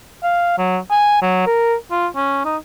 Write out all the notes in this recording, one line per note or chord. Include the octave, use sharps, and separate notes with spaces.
F5
F#3
G#5
F#3
A#4
F4
C#4
D#4